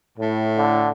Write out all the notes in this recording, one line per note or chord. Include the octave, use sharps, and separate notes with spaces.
A2
D3